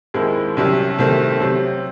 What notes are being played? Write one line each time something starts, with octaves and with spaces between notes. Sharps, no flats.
D#2 D#3 G#3 C4 E4
C2 C3 F#3 C#4
C2 C3 D#3 A3 C4
C3 F#3 C4